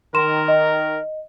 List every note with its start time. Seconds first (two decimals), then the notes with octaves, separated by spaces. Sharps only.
0.14 D#3 A#4 C6 E7
0.48 D#5